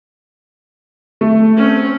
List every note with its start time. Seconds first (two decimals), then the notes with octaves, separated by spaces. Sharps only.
1.21 A3
1.57 C4 C#4